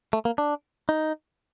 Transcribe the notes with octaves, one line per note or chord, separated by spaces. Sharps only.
A3
A#3
D4
D#4